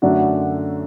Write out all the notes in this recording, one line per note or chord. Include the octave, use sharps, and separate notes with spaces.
F#2 D3 F#3 A3 D4 F#4